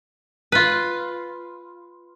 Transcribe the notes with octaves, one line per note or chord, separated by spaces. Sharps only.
F4 B4